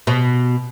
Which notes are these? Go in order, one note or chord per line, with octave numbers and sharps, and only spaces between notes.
B2